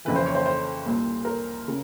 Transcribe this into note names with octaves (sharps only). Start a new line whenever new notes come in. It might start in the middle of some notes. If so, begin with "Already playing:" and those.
F2 C#3 E3 B4
C5
C#5
C5
C5
C2 A#2
A#4
C#3